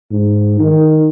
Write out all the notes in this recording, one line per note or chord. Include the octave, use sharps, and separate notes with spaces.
G#2
D#3